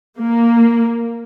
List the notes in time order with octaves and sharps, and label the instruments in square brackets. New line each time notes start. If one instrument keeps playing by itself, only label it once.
[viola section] A#3